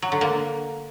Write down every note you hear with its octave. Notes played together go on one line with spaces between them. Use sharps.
F#3
D3
A#3